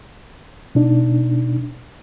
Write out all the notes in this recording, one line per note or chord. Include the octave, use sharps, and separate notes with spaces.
B2 D4 D#4